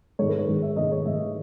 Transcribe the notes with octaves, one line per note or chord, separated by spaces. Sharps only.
G#2 D#3 G#3 C#5
B4
C#5
G#2 D#3 G#3
E5
G#2 D#3 G#3 D#5
C#5
G#2 D#3 G#3 E5